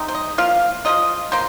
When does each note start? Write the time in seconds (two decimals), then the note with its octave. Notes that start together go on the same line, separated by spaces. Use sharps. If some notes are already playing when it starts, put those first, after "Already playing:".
Already playing: C3 G#3 C4 D#4
0.08 C5
0.15 D#5
0.38 F3 A#3 F4 F5
0.85 F3 A#3 F4 D#5
1.32 F3 A#3 C5